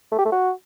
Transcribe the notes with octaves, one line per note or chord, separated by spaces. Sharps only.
A3
G4
A3
F#4